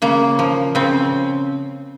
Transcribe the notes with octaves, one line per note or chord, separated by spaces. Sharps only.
C#3 A#3
F3
C#3 C4